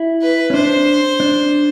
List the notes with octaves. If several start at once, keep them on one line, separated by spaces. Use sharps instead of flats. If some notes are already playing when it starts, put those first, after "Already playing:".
Already playing: E4
B4
C#4
D4 C5
D4